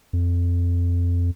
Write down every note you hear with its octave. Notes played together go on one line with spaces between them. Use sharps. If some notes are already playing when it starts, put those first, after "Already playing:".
F2